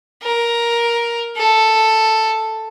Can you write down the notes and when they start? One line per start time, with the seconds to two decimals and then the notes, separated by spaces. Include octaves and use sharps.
0.23 A#4
1.37 A4